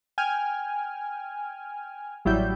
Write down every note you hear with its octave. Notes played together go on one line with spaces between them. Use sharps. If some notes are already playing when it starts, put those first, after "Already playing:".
G5 G#5 F6
A1 F#3 G3 E4 E5 G6